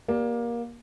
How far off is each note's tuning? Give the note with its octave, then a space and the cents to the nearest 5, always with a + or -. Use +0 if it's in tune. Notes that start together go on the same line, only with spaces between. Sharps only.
A#3 +20 G4 +0 D5 -5